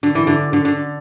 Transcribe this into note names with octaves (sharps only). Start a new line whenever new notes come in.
D3
E3
D3
D3
D3